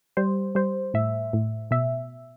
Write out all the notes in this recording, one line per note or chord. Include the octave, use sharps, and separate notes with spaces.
G3 C5
G3 C5
A2 E5
A2
B2 E5